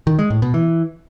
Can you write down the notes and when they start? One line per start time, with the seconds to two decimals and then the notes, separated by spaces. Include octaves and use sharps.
0.07 D#3
0.19 G#3
0.30 A2
0.42 B2
0.54 E3